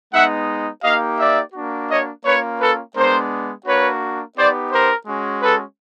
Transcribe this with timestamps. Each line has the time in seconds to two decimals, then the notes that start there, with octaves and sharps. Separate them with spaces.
0.13 G#3 B3 D#4 E5 F#5
0.84 A#3 D#4 G4 D#5 F5
1.19 D5 E5
1.54 A#3 D4 F#4
1.90 C#5 D#5
2.25 A#3 C#4 F4 B4 C#5
2.60 A4 B4
2.95 G#3 B3 D4 A#4 C5
3.66 A#3 D4 F#4 B4 C#5
4.37 B3 D#4 G4 C5 D5
4.72 A#4 C5
5.07 G#3 C#4 F#4
5.43 A4 B4